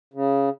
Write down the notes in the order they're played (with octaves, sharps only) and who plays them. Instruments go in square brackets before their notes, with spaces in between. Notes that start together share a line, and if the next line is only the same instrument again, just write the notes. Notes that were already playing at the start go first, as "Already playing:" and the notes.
[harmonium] C#3